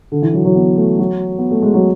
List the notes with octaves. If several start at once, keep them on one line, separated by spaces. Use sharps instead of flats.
D3
E3
F#3
F#3
B3
A3
F#3
B3
A3
G#3
F#3